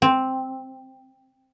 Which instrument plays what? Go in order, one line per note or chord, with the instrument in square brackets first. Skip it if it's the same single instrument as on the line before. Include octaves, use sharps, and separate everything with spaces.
[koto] C4